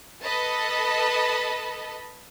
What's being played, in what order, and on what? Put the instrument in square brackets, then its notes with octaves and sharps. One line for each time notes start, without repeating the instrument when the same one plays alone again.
[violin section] A4 B4 D#5 A5 B5